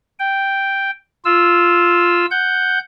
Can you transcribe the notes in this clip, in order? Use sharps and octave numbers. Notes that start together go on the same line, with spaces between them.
G5
F4 E6
F#5 G6